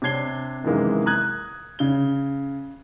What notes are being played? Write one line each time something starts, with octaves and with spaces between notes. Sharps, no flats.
C3 D4 C#5 G#6 C7 G7
F#2 C3 D#3 E3 G#3 A#3
A#5 D#6 F#6 G#6
C#3 G7